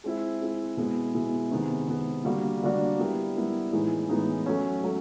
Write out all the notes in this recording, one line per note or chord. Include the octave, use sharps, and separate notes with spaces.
G#3 C4 E4
G#3 C4 E4
B2 G#3 B3 E4
B2 G#3 B3 E4
C3 D#3 G#3 B3
C3 D#3 G#3 B3
D3 G3 A#3 D4 F#4
D3 G3 A#3 D4 F#4
G3 B3 E4 G4 A#4
G3 B3 E4 G4 A#4
A2 E3 G#3 B3 D#4
A2 E3 G#3 B3 D#4
F#3 A3 C#4
F#3 A3 C#4